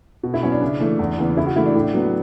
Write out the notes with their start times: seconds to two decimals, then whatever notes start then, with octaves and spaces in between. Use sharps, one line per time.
0.23 B2
0.34 E4
0.43 F#3 B3 C#4
0.52 D4
0.61 C#3
0.80 E3 A3
0.99 E2
1.18 C#3 E3 B3
1.37 C#3 E4
1.46 F#4
1.56 E3 A3 E4
1.66 D4
1.75 A2
1.94 F#3 B3